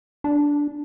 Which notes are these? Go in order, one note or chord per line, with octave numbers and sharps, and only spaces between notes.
D4